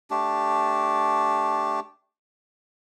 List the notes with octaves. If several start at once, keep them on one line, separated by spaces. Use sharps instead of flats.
A3 D4 G4